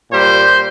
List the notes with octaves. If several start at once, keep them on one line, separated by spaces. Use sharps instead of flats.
A#2 G3 C5